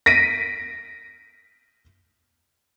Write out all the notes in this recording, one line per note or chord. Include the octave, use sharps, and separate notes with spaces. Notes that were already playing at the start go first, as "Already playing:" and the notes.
A#6 B6 D7 D#7